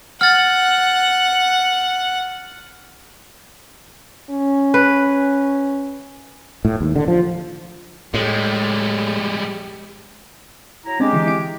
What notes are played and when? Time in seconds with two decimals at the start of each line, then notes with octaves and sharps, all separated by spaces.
0.21 F#5 F6 A6
4.30 C#4
4.74 B4
6.65 A2
6.81 D#2
6.96 D3
7.08 F3
8.14 A2 G3 G#3
10.85 F#3 E4 A#5
11.00 G#3 C4 D4 G4
11.13 D3 E3 E4
11.27 E4 D7